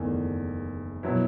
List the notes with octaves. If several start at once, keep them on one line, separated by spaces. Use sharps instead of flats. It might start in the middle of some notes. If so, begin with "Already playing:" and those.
Already playing: F#1 E2 D#3 A3
B2 F#3 B3 E4